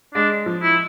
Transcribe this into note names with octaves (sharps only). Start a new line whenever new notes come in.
G#3 D4
F3
E4